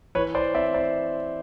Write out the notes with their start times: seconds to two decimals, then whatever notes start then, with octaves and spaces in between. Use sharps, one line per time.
0.15 E3 B4 C#5
0.35 C5 D5
0.55 C4 D5 E5
0.74 C5 D5